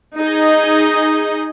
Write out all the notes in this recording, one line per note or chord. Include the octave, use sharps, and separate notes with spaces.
D#4 G#4 D#5